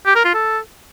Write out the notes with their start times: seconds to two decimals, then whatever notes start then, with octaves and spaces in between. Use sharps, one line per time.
0.06 G4
0.15 A#4
0.25 F4
0.34 A4